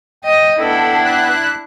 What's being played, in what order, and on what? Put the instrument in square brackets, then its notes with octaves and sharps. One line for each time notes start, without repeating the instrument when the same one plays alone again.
[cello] D#5 [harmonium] G5
[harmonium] B3 G5 [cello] D4 E4 [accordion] A4
[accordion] F#6